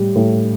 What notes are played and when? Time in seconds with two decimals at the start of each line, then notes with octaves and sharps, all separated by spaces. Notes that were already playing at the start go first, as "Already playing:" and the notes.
Already playing: A2 G3
0.16 A2